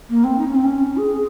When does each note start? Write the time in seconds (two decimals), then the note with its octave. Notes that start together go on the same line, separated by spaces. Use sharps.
0.09 A#3
0.24 C4
0.38 D#4
0.47 C#4
0.55 C4
0.64 C#4
0.97 G#4